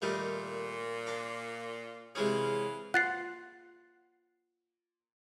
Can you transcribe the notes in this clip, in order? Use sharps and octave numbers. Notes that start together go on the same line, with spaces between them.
A#2 D#3 G3 A3
D4
C3 E3 G#3 C#4 G#4 F5
F4 F#5 F#6 A6 C7